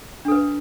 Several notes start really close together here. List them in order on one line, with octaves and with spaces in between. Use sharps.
D4 A4 B4